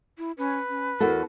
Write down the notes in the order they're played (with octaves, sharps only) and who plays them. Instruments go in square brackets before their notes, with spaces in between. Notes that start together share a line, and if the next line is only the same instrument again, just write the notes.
[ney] E4
[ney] C#4 [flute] B4
[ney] C#4
[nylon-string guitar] E2 F#4 A4 [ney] A#4